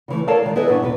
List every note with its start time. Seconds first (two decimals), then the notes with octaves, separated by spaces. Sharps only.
0.08 C#3 E3 A3
0.27 A4 A#4 C#5 D5 F5 A5
0.42 D#3 G#3
0.56 E4 G#4 A4 B4 D#5
0.68 G2 A#2 B3 C#4 D4
0.82 D#2 C3 B4